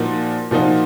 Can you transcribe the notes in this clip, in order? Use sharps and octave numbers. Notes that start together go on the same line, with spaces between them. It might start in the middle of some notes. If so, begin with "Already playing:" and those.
Already playing: A#2 F3 A#3 D#4 F#4
A#2 F3 A#3 D#4 F#4